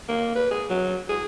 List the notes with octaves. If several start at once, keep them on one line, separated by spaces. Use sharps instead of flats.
A#3
B4
G#4
F#3
G#4